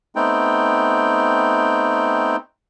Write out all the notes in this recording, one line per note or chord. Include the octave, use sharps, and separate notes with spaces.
A3 B3 C4 D#4 G5